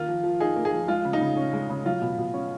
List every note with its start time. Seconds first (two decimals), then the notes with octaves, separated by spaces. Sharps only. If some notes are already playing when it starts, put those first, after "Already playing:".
Already playing: D#3 A#3 F4
0.08 F3
0.23 F3
0.40 D#4 G#4
0.56 A#3
0.65 G#4
0.72 F3
0.88 G#3 F4
1.05 C#3
1.13 D#4
1.21 C#3
1.37 C#4
1.53 G#3
1.70 C#3
1.85 F#3 F4
2.02 B2
2.18 B2
2.34 C#4